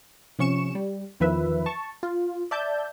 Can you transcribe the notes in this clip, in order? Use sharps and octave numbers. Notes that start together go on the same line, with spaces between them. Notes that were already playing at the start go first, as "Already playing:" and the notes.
C3 F3 C#4 C#6 C#7 E7
G3
E2 D#3 F3 B4 E5
A5 C#6
F4
D5 E5 A5 G6